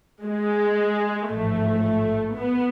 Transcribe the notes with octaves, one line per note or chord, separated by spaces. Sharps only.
G#3
A1 G#2 F3 A3
B3